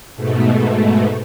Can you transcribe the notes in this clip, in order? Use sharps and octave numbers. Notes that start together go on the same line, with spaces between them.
G#2 B2 A3